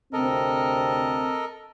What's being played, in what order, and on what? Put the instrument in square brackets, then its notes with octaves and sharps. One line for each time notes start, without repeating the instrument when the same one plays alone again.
[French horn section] D2 C3 C4 [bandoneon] A4 A#4 D#5